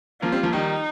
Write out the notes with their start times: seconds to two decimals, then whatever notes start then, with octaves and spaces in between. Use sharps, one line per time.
0.22 F3 A#3 F4
0.32 G3 C4
0.43 F3 A#3
0.53 D#3 G3 D#4